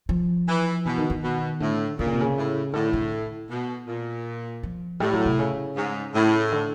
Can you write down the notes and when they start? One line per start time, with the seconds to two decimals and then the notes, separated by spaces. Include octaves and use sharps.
0.09 F3
0.48 E3
0.85 B2 E3
0.98 D#3
1.10 D#3
1.23 B2
1.60 A2 D3
1.98 A#2 D3
2.06 C#3
2.13 C3
2.21 C#3
2.36 A2
2.73 A2 D3
2.93 D3
3.49 B2
3.87 A#2
4.63 F3
5.00 A2 G3
5.13 F#3
5.25 C3
5.39 C#3
5.76 G#2
6.14 A2
6.52 D3